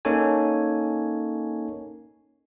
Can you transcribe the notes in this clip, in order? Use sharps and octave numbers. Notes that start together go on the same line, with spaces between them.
A#3 C#4 D#4 A4 C#5 G#5